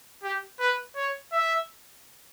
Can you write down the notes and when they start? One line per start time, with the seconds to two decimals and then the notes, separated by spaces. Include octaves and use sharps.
0.23 G4
0.59 B4
0.96 C#5
1.32 E5